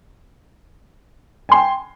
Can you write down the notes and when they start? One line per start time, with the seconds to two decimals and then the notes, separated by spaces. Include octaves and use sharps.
1.49 G#5
1.52 C6
1.54 G5